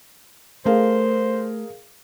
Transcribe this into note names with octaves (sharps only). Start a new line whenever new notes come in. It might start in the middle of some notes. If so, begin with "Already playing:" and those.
A3 G#4 A#4 C5 F5